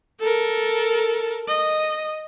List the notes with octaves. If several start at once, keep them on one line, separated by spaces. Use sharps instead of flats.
A4 A#4
D#5